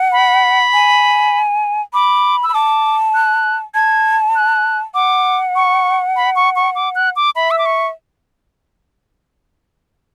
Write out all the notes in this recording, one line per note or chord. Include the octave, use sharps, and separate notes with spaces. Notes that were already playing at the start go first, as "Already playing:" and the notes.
Already playing: F#5
B5
G#5
B5 D6
E6
B5
A5 D6
F#6
A5 G#6
F#6
F#5 D6
C#6
B5
C#6
C#6
D6
F#6
D6
E5 B5
E6
D6
C#6